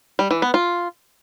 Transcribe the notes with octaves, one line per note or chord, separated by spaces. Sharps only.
G3
E3
B3
F4